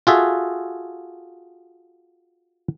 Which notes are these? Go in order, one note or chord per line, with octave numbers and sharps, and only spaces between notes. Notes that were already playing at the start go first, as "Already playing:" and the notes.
F4 F#4 G#4 A4 E5